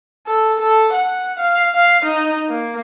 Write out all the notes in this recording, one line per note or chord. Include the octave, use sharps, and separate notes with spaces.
A4
A4
F#5
F5
F5
D#4
A#3